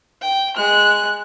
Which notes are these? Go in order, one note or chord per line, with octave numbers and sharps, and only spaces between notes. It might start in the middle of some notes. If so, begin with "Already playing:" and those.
G5
G#3 F#6